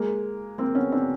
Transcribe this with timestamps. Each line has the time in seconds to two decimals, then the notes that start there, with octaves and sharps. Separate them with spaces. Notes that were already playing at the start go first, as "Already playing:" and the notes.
Already playing: G#3 A#3
0.58 A#3 C4
0.75 B3 C#4
0.92 C4 D4